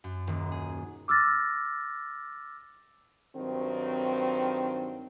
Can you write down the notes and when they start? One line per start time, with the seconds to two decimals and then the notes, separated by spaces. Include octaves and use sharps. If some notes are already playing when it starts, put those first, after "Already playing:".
0.04 F#2
0.27 D#1
0.52 G#4
1.08 D6 E6 F6 A6 A#6
3.36 G2 D#3 F#3 C4